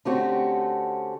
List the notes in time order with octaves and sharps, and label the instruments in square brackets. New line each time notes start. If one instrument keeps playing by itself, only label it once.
[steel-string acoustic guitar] D3 A3 C4 C#4 F#4 G4